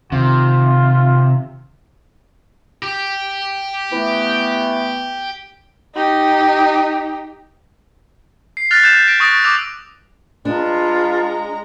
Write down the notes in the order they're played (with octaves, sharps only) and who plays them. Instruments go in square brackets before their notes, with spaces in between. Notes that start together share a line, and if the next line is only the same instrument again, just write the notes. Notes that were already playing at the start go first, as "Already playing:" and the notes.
[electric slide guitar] C3 [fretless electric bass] D#3 [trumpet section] F4
[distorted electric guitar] G4
[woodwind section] E3 A3 B3
[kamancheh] D#4 G4
[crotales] C7
F6 F#6 A6 B6 F7
F#6 G6 E7
A#6 B6 D7
C#6 D#6 A6 A#6 D7
D6 E6 F7
[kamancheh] G#3 A#5 [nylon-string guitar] D4 [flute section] F4 B4 A5